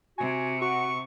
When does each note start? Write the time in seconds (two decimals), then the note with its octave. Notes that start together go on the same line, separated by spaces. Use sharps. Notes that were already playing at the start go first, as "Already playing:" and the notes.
0.18 C3 F#4 G#5
0.61 F#4 C#6